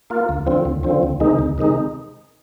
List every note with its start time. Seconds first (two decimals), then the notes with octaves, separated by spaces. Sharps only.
0.10 A#3 F4
0.29 D2
0.46 D3 F3 C4
0.65 D2
0.83 D3 F3 C4
1.03 D2
1.20 C3 D#3 G#3 D#4
1.39 D2
1.58 C3 D#3 G#3 D#4